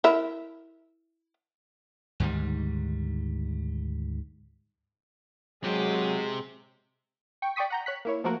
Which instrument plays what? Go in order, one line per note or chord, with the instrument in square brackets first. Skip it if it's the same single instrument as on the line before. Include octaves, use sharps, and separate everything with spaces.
[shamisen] E4 A#4 E5
[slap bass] D2 G#2 D#3 G3
[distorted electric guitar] C3 G4 [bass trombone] F#3 [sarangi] G#3
[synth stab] G5 C#6
D5 G5 C#6 D#6 B6
F#5 A#5 G6
C#5 F#6 B6
A#3 E4 C#5
F3 A3 A#3 F#4 A#4